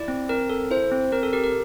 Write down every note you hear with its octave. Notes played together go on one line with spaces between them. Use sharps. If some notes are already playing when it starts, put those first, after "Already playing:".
Already playing: E4 D5
C4
C4 A#4
A4
E4 C5
C4
C4 A#4
A4
G4 A#4
A#4